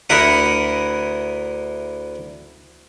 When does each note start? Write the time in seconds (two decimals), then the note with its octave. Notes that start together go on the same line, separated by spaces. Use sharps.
0.10 D2 E4 A#4 F#5 B5 D#6